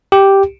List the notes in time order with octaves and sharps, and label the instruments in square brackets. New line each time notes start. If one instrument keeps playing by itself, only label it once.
[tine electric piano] G4